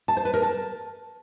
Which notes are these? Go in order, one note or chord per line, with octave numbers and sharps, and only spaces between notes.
A5
C5
B4
A#4
A5